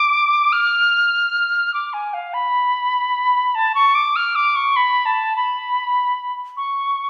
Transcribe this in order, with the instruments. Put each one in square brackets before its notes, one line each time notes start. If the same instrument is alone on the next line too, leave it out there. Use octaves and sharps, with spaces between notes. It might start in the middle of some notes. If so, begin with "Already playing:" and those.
Already playing: [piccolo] D6
F6
D6
G#5
F5
B5
A5
C#6
D6
F6
D6
C#6
B5
A5
B5
C#6